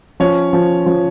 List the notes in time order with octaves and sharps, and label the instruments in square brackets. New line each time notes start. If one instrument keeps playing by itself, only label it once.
[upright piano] F3 [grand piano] C#4 C#5
[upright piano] F3
F3